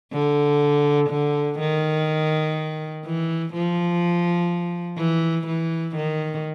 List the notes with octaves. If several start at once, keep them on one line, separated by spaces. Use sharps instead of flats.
D3
D3
D#3
E3
F3
E3
E3
D#3